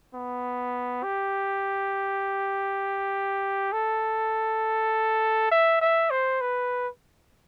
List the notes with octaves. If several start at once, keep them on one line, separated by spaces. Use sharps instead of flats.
B3
G4
A4
E5
E5
C5
B4